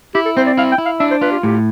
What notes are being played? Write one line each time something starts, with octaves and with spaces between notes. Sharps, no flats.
E4 G4
A4
C4 C5
D5
E4 F5
G5
E4
F5
D4 E5
C5
F4 B4
G4
A2 G4